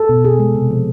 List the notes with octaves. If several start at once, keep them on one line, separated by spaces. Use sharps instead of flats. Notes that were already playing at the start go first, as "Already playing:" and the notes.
Already playing: A4
B2
B2 G#4
G#3
C3
F3